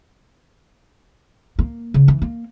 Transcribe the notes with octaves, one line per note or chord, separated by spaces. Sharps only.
A#3
C#3
E3
A#3